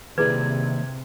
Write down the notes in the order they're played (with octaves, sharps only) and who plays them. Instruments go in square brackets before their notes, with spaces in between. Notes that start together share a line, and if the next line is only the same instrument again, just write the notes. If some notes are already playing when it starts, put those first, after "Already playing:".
[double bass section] C3 [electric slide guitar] D#3 A#3 D5 [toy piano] E4 G#4 B4 [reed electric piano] G#6